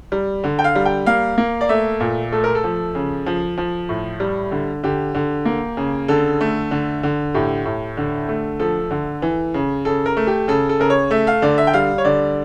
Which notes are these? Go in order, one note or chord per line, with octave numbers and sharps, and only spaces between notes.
G3
D3
G5
F5
G3
G5
A#3 F5
A#3
D5
A3 E5
A#2
A3 A4
A#4
A4
F3
C#3
F3
F3
A2
G3
D3
D3 G4
D3
A#3
C#3
D3 A4
A3
D3
D3
A2 G4
A2
D3
A3
F3 A4
D3
E3
C#3
C#3 A4
A#4
A3
G4
C#3 A4
A4
C#3 A#4
C#5
A3 E5
F5
D3 D5
E5
G5
G3 F5
C#5
D3 D5